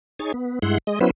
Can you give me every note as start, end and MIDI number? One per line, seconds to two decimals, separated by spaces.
0.19 0.32 63
0.19 0.32 68
0.19 0.32 73
0.19 0.32 80
0.19 0.32 93
0.34 0.59 59
0.62 0.78 43
0.62 0.78 56
0.62 0.78 64
0.62 0.78 78
0.62 0.78 84
0.87 0.99 56
0.87 0.99 75
1.01 1.10 54
1.01 1.10 59
1.01 1.10 61
1.01 1.10 64
1.01 1.10 71
1.01 1.10 72